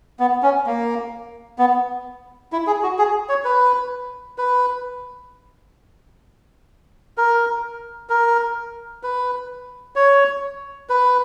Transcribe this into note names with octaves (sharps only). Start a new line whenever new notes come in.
B3
C#4
A#3
B3
E4
G#4
F#4
G#4
C#5
B4
B4
A#4
A#4
B4
C#5
B4